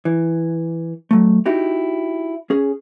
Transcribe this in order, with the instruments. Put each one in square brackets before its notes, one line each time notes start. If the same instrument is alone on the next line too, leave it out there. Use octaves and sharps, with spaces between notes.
[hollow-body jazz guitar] E3
F#3 A3
D#4 E4 F#4 G4
C#4 G#4